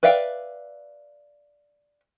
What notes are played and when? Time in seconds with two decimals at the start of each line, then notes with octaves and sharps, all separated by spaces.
0.03 B4 D5 E5 F5 G5